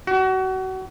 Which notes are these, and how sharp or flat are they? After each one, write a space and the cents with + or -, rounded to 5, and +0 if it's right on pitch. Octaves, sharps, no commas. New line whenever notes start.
F#4 +30